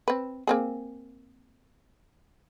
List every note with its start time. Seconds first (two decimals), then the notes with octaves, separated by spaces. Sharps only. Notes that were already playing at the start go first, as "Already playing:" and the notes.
0.08 C4 B4
0.47 A#3 C4 G#4